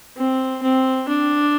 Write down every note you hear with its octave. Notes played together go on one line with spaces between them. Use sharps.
C4
C4
D4